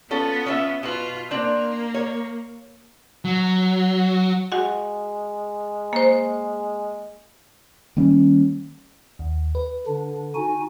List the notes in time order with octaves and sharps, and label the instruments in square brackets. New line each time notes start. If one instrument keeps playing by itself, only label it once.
[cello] B3 [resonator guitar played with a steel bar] C#4 F4 A4
[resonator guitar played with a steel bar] C#4 F4 E5
[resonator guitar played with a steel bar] B2 B4 [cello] F4
[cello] A#3 [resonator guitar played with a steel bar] C4 D4
[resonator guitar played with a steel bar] C#5
[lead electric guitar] F#3
[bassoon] G#3 [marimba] F#4 F#5
[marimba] A#3 C5
[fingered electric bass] D#3 G3 A#3 C#4
[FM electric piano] D#2
B4
[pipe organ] D3 D4
D#4 F#4 G#5